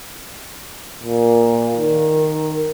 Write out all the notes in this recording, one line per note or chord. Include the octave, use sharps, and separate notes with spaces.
A#2
D#3